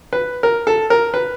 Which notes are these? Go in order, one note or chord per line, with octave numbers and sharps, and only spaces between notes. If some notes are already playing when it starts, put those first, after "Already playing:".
B4
A#4
A4
A#4
B4